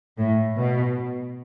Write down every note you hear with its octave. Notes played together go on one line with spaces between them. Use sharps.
A2
B2